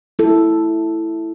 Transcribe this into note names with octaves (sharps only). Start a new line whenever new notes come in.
E4 A4